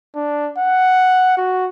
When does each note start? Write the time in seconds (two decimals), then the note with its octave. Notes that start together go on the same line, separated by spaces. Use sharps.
0.16 D4
0.58 F#5
1.38 F#4